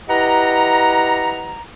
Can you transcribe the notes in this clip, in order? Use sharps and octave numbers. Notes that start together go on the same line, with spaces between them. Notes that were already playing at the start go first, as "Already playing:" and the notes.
E4 G4 B4 D#5 F#5 A#5